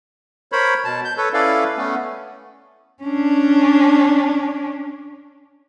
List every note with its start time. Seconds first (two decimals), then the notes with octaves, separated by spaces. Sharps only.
0.52 A#4 C5 C#5 B5
0.85 B2 A5
1.05 G6
1.17 A4 B4 C#5
1.33 C#4 E4 A4 B4 D5 F5
1.77 A3 B3 C#4
3.03 C#4 D4